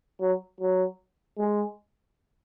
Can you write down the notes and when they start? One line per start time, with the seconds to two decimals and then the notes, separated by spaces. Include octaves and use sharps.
0.20 F#3
0.60 F#3
1.38 G#3